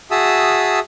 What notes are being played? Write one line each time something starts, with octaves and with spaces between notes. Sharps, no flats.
F#4 G#4 E5 A5 D#6 E6